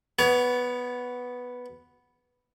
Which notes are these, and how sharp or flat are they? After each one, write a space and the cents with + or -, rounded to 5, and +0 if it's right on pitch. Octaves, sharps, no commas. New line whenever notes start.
B3 +0 C#5 +30